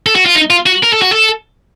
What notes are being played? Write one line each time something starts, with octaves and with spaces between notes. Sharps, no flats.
A4
F#4
F4
D#4
F4
F#4
A#4
A4
F#4
A4